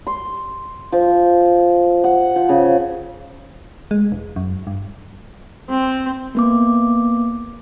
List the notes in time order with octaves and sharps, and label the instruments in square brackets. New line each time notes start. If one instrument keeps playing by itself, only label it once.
[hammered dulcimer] C6
F3
F#5
F3
C#3
[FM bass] G#3
E1
F#2
G2
[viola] C4
[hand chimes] A#3 B3 D6